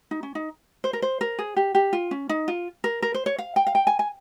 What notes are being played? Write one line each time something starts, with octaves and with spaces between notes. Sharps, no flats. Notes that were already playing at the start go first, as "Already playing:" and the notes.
D#4
C#4
D#4
C5
A#4
C5
A#4
G#4
G4
G4
F4
C#4
D#4
F4
A#4
A#4
C5
C#5
F5
G5
F5
G5
G#5
G#5